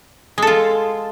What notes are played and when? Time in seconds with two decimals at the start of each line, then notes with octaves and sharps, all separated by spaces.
0.38 G#3
0.42 A4
0.47 F4